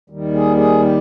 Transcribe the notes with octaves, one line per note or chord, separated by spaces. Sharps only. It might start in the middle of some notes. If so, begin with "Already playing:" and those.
D#2 D#3 G3
G#4
G#4
G4